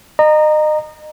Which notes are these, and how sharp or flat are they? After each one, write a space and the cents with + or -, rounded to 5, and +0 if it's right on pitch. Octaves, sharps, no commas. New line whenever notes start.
D#5 -30 A#5 -5